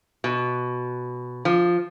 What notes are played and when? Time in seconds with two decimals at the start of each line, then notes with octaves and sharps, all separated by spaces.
0.24 B2
1.45 F3